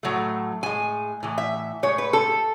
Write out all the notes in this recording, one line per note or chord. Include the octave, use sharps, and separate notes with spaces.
A2 F#3 A3
A2 G#3 G#5
A2 E3
E5
A2 G#3 C#5
B4
A4